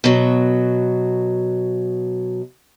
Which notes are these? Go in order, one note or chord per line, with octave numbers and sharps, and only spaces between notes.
B2 F#3